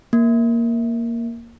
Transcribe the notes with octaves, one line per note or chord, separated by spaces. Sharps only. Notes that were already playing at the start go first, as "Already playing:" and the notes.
A#3